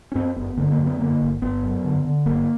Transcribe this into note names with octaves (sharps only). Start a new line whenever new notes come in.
C#4
F#2 C4
G1 B3
D3 A#3
B3
A#3
F#2
B3
D3 A#3
G1
G1 B3
F#2
D3
D3
G1 A#3